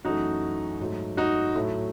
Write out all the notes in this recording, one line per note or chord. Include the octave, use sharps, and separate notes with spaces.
F#2 E3 A3 D#4 F#4
G#2 F#3 A3
D#4 F#4
A2 F#3 A3